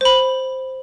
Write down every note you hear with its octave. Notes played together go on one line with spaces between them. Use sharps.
C5 B5